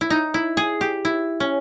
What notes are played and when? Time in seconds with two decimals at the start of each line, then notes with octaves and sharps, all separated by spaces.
0.01 E4
0.10 D#4
0.34 E4
0.57 G#4
0.81 G4
1.05 E4
1.40 C#4